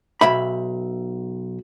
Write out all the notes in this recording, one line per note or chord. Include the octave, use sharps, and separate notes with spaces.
B1 E5 B5